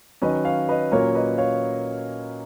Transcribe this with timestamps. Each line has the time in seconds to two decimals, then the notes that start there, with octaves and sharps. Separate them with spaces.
0.22 D#3 F#3 C#4 B4 D#5
0.45 C#5 F5
0.69 B4 D#5
0.92 A#2 F#3 A#3 C#4 F4 A#4 C#5
1.15 B4 D#5
1.38 C#5 F5